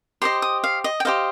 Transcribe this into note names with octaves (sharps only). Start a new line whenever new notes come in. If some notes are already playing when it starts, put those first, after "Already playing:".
G4 C5 D#5 C6
D#6
F5
D#5
G5
G4 C5 D#5 F5